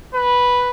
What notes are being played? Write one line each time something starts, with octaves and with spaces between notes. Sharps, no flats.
B4